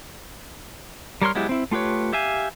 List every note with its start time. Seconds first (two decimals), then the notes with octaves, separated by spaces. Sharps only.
1.22 G3 A#4 C#5 C6 F6
1.35 F#3 G#3 B3 E4 G4
1.49 C4 E4
1.71 A3 F4 G4 B4 C#5
2.13 G4 E5 F5 G#5